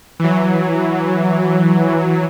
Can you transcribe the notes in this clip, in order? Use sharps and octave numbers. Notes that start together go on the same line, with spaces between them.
E3 F#3